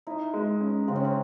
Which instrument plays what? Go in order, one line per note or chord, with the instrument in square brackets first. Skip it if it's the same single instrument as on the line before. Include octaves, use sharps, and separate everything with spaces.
[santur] D#4 [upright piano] E4
[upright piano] G#3
C#4
[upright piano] C#3 [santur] C4
[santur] C#4
C4